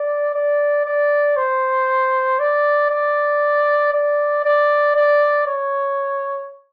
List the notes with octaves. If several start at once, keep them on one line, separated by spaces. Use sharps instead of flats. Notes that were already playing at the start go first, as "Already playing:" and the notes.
Already playing: D5
D5
D5
C5
D5
D5
D5
D5
D5
C#5